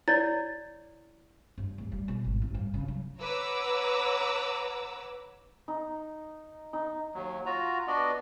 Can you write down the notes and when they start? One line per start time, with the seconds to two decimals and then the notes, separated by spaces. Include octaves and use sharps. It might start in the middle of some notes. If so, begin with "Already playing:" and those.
0.08 E4 C#5 D5 A6
1.58 G2
1.78 D1
1.92 G3
2.08 B2
2.24 G#1
2.42 A1
2.54 G2
2.74 C#3
2.88 F#3
3.20 B4 C#5 F#5 A#5 D6 E6
5.68 D#4
6.73 D#4
7.15 D#2 F#3
7.46 F4 F#4 A#5
7.88 B3 D4 F#4 D5 D#5